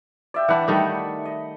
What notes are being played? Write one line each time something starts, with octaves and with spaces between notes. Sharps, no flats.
D5 E5 G5
E3 D4 F#5 B5
D#3 G3 A3
D#5